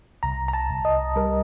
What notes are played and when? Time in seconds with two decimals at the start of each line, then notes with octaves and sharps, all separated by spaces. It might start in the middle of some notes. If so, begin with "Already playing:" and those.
0.23 C2 A#5
0.48 A#5
0.53 A5
0.70 C2
0.85 D#5
1.16 G3 A#4